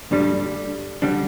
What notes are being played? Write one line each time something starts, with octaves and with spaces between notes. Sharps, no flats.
G2 D3 G3 D4
D3 G3 D4